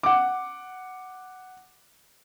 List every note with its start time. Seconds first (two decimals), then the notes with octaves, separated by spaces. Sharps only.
0.03 F#5 D6